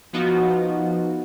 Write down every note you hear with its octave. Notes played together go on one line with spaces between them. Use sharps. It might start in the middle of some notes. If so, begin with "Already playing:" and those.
F3 B3 D#4 F4 F#4